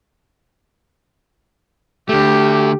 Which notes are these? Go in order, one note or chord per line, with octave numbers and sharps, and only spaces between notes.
D3 A3 G4